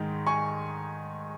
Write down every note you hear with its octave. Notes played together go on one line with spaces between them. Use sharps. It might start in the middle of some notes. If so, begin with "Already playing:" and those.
Already playing: G#2 D#3 G#3
G#5 C#6